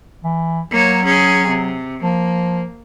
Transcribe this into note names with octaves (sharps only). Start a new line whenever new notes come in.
E3
F#3 A#3 C#5
C#4 G#4
C3
F3 A#3